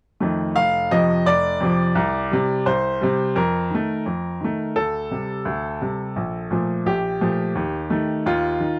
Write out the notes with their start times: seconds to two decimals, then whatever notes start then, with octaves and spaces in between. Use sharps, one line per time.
0.20 F2 D#3 A3
0.56 F1 F5
0.91 F2 C3 F3 D#5
1.26 F1 D5
1.60 F2 C3 F3
1.95 C2
2.31 C3 G3
2.66 C2 C5
3.01 C3 G3
3.36 F2 A#4
3.70 D#3 A3
4.06 F2
4.41 D#3 A3
4.76 D2 A4
5.11 C3 G3
5.45 D2
5.81 C3 G3
6.16 A#1
6.51 A#2 F3 A3
6.86 A#1 G4
7.21 A#2 F3 A3
7.55 D#2
7.90 D#3 A3
8.26 D#2 F4
8.60 D#3